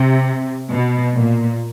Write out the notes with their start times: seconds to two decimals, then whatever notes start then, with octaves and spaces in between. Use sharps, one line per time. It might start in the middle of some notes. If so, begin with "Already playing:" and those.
Already playing: C3
0.71 B2
1.16 A#2